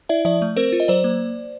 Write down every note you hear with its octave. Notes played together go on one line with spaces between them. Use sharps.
E4 D5 E5
F3 D5 E5
A3
C4 A#4 C5
F4
D#5
F#3 C5 D5
A#3